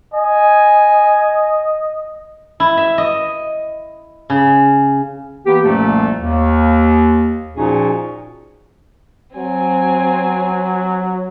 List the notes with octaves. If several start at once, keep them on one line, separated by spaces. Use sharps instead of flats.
D#5 G#5
E4
E5
D#5
C#3
E3 A#3 B3 G4
C2 F#2 A#2 F3 A3 A#3
D#2
A#2 F3 C#4 D#4 F#4 G#4
F#3 C4 G#5